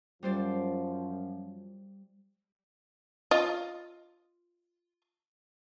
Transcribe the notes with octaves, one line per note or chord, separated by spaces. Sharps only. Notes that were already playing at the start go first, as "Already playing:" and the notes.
F#2 F3 G3 C5 D5
F4 D#5